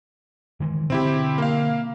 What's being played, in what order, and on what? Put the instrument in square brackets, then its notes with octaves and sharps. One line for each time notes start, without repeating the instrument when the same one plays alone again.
[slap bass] D#3 E3 G#3
[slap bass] B2 D3 [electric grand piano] C4 E4 G4
[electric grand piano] A#3 F5